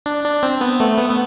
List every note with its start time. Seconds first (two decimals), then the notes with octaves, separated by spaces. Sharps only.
0.06 D4
0.25 D4
0.43 C4
0.61 B3
0.80 A3
0.98 B3
1.10 B3